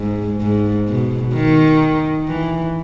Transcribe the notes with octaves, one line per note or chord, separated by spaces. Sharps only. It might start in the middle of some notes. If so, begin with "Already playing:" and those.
Already playing: G#2
G#2
B2
D#3
E3